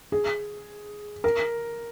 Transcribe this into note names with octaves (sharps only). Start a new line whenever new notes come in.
G#4
A#4